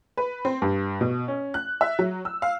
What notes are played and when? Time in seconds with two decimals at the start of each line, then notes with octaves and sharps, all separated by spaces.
0.17 B4
0.45 C4
0.62 G2
1.01 B2
1.28 C#4
1.54 F#6
1.81 E5
1.99 F#3
2.25 E6
2.42 F5